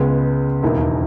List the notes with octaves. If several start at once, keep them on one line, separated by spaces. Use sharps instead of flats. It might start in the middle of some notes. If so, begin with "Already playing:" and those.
Already playing: C#2 C#3 G#3 B3
E1 D#2 D#3 A#3 E4